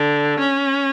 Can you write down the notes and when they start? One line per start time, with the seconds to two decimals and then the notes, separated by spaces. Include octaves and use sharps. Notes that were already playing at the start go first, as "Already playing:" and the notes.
Already playing: D3
0.40 C#4